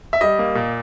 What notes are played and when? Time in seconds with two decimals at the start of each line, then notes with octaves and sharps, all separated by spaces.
0.13 E5
0.21 G3 D#5
0.39 A#3
0.55 A#2